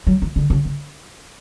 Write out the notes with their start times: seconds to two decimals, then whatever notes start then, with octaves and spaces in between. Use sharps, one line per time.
0.07 F#3
0.22 E3
0.36 D3
0.50 C#3
0.65 C#3